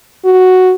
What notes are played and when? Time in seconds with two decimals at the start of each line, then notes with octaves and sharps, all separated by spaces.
0.25 F#4